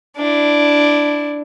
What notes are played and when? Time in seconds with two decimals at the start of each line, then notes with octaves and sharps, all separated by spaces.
0.17 D4 E4